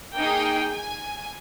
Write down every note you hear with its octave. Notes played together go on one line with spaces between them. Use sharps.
A#3 D#4 G#4 G5
G#5